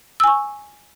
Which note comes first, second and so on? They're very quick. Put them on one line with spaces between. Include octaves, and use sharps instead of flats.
E6 G#5 C#6